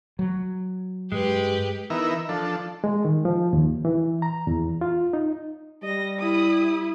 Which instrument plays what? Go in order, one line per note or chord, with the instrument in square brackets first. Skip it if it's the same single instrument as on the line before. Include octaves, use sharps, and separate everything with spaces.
[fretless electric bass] F#3
[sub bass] G2 [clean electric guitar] G#3 [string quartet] G4 B4
[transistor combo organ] E3 B3 D#4 A#4 E5
F3 D4 A4
[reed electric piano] G#3
D#3
F3
D#2
E3
A#5
E2
F4
D#4
[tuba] G3 [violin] D#5 A#6
[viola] E4 [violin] D#6